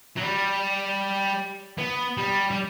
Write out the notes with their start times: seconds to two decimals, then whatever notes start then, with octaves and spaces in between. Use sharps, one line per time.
0.17 F#3
0.22 G3
1.78 B3
2.18 G3
2.51 G3